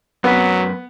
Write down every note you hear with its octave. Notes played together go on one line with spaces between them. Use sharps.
F#2 F#3 B3 B4